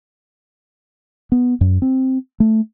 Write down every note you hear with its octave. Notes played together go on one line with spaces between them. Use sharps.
B3
F#2
C4
A3